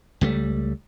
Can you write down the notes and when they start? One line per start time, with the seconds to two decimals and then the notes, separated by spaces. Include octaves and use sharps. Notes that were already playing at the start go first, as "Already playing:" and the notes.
0.21 C#2 G3 A3